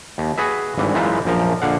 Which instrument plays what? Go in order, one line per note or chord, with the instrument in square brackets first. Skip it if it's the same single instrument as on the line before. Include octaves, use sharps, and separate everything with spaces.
[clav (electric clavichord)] D#2
F#4 G#4 B4 E5
G#1 G2 E3
F#2 E3 G#3 D#4 F4 E5
A#1 F#2 F3 A#4
A#1 D3 F5 F#5